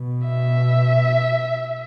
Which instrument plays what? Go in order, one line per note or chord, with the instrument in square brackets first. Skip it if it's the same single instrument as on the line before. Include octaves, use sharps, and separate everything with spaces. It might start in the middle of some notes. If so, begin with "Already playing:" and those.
Already playing: [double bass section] B2
[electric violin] E5